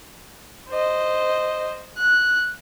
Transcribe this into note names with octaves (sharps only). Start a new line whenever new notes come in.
C5 D#5
F#6